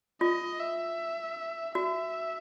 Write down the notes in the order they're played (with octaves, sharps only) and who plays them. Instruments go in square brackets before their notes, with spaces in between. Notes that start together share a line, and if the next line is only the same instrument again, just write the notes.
[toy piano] F4 [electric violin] D#5
[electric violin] E5
[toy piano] F#4 [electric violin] E5